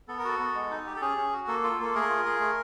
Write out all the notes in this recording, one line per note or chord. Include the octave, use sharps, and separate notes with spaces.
B3 A4
A#4
F#4 A4
B3
G#3
D#4
G4
A4
C#4 G#4
C#4
F#4
A#3 A4
F4
A#3 A4
A3 G#4 A#4
F4
G#4
A3